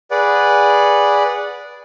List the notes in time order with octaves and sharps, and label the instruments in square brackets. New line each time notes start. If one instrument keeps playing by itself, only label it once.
[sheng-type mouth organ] G#4 B4 D5 F#5